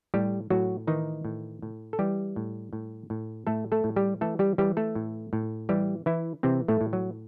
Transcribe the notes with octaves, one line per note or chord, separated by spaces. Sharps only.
A2 G3 G4
A2 F#3 F#4
D#3 E3 D#4
A2
A2
A4
E3 G3 G4
A2
A2
A2
A2 A3 A4
A3 A4
A2
G3 G4
E3 A3 A4
G3 G4
E3 G3 G4
A3 A4
A2
A2
E3 G3 G4
E3 E4
C3 E3 C4
A2 A3
A2
F#3